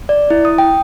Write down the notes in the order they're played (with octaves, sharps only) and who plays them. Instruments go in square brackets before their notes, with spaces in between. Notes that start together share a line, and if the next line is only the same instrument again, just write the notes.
[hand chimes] D5
E4
D#6
G5